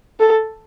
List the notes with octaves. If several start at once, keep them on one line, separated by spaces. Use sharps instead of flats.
A4